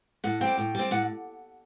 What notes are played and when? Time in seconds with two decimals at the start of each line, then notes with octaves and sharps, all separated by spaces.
0.24 A2 F#5
0.41 G3 C4 G5
0.58 A2
0.75 G3 C4
0.91 A2 F#5